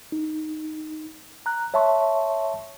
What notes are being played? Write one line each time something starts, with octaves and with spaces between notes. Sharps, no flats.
D#4
A#5 F#6
C#5 E5 A5 C6 C#6